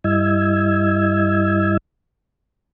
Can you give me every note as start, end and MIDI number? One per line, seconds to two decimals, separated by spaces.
0.04 1.77 43
0.04 1.77 55
0.04 1.77 64
0.04 1.77 75
0.04 1.77 88
0.04 1.77 92